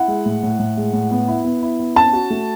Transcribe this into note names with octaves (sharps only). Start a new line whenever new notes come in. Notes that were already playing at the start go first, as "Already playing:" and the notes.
Already playing: E4 F#5
G#3
A2
A2
A2
G#3
A2
B3
E4
B3
E4
B3
C#4 A5
F#4
A3